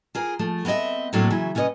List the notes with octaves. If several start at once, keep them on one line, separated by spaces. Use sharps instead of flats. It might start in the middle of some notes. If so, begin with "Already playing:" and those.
F4 G#4 A#4
F3 A3
B3 C4 C#5 D#5 E5
A2 F#3 A3 A#3 C4 D4
C#3 E3 F#3 E5
C3 C#4 B4 C#5 D#5